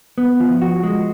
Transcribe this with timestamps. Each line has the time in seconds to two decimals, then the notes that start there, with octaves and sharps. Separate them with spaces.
0.18 B3
0.40 F3
0.62 F#4
0.83 G#3